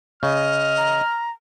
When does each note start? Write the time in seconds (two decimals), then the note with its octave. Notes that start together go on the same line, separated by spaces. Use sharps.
0.23 C#3 D#5 F6
0.77 A#5